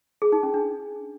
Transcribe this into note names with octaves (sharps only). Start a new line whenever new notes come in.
G#4
D#4
C#4
D4